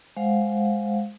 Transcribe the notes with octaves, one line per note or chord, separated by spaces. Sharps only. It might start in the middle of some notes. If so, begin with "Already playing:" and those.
G#3 C5 F5 F#5